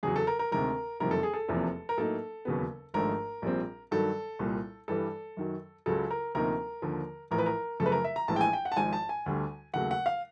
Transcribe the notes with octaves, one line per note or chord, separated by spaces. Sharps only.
E2 C#3 F#3 G#4
A4
A#4
A#4
D2 C3 D#3 G#3 A#4
F#1 F2 C3 D#3 G3 A#4
A4
G#4
A4
F1 E2 C3 F3 A#3
A#4
A2 F#3 A#3 D#4 A4
E1 D#2 C#3 F#3 B3
G#1 G#2 F3 A3 D4 A#4
A#1 A#2 G3 C4
G2 D#3 F#3 A4
C2 A#2 G3
G2 E3 G3 A4
F#2 D#3 F#3
C#2 C#3 F#3 A4
A#4
D2 C3 F3 A#3 D#4 A#4
D#2 D3 F3
A1 A2 F3 A#4
B4
A#4
F#2 C#3 F3 A3 A4
B4
A#4
E5
A#5
A#1 A2 E3 G#3 A5
G5
G#5
G5
F#5
A5
G#1 G#2 F3 G#5
A5
G#5
D2 D3 G3
D#2 C#3 F#3 A3 F#5
F#5
F5